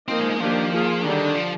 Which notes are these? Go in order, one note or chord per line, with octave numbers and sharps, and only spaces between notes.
F3 A#3 C4 D#4
G#3
G#3
D#3 F3 A#3 D4 G4
A#3 F4 G#4
D3 D#3 G3 D4
F3